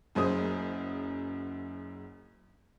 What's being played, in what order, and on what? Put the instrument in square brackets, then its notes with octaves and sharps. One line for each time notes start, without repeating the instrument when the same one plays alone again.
[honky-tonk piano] F#1 F#2 G#4 C5 D#6